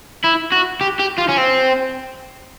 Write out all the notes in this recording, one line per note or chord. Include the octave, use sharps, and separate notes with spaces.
E4
F#4
G4
G4
F4
C#4
C4